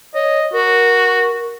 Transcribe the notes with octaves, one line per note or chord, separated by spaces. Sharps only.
C#5 D#5
F#4 A#4